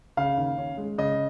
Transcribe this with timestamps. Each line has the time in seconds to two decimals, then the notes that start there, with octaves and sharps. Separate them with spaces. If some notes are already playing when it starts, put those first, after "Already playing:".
0.17 C#3 F5
0.37 D#2
0.58 C#4
0.77 G#3
0.98 C#3 D#5